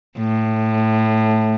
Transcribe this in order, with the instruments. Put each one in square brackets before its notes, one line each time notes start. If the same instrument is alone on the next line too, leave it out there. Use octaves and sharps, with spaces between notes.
[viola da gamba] A2